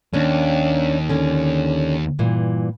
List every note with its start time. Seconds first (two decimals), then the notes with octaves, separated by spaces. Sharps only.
0.13 D#2 C#4 D4
1.09 D3 C#4
2.19 G2 A#2 E3